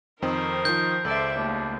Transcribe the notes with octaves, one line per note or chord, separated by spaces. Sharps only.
F2 D#3 C4 D#4 A#4 C5
D#3 F3 G6
C#2 A4 C5 D5 E5
D#2 A3 D4